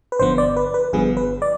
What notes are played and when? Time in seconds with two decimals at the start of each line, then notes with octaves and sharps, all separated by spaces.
0.12 B4
0.19 G1 G2 D3 F3 B3 C5
0.38 D5
0.56 B4
0.74 B4
0.93 G1 G2 D3 F3 B3 G#4
1.17 B4
1.42 D5